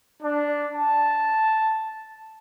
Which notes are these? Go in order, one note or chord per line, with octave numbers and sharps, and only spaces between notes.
D4
A5